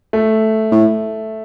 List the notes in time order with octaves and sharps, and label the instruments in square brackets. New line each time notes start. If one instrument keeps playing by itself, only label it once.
[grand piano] A3
[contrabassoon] A2